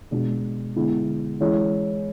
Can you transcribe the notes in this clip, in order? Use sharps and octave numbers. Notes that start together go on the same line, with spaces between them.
B2 G#3 B3 D4
D3 G#3 B3 E4
E3 G#3 C#4 E4